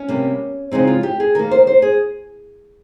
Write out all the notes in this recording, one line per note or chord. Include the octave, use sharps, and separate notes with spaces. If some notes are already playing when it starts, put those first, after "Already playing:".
Already playing: C#4
C3 G3 A#3
C#3 F3 G#3 C4 D#4
F4
G4
G#4
D#3 A#3 A#4
C5
C5
G#4